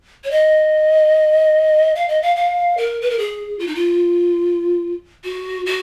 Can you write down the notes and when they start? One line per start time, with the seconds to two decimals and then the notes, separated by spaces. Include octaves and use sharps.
0.24 C#5
0.31 D#5
1.95 F5
2.08 D#5
2.22 F5
2.36 F5
2.77 A#4
3.01 B4
3.10 A#4
3.19 G#4
3.59 F4
3.67 D#4
3.75 F4
5.24 F#4
5.66 F#4